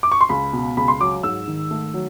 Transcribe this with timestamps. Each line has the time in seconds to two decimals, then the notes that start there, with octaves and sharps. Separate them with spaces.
0.03 D6
0.12 C#6
0.21 C6
0.29 C#2 B5
0.53 B2
0.77 C#2 B5
0.88 C6
1.00 F#3 D6
1.23 G#2 E6
1.48 D#3
1.71 A3
1.94 F#3